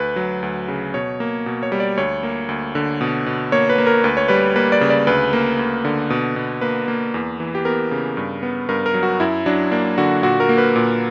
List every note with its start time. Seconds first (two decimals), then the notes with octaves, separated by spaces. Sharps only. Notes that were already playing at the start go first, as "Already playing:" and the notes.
Already playing: D2 B4
0.16 F#3
0.42 D2
0.68 C#3
0.94 B2 C#5
1.20 A#3
1.46 B2
1.63 C#5
1.72 G3
1.80 D5
1.97 D2 C#5
2.23 A#3
2.49 D2
2.75 D3
3.01 B2
3.26 B2
3.52 A#3 C#5
3.69 B4
3.78 A#3
3.87 A#4
4.04 D2 B4
4.17 C#5
4.28 G3 B4
4.56 A#3 B4
4.72 D5
4.81 C#3
4.90 D5
5.07 D2 B4
5.33 A#3
5.59 D2
5.85 D3
6.10 B2
6.36 B2
6.61 A#3 B4
6.88 A#3
7.14 E2
7.40 E3
7.55 G4
7.65 B3 A#4
7.91 C#3
8.17 G2
8.43 B3
8.69 G2 A#4
8.86 A#4
8.94 F#3
9.03 F#4
9.20 F#2 E4
9.46 F#3 D4
9.71 A#3 D4
9.98 D3 F#4
10.23 A#2 F#4
10.40 A#4
10.49 A#3
10.58 B4
10.76 A#2